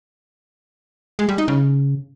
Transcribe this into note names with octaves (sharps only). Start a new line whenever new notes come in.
G#3
G3
D#4
C#3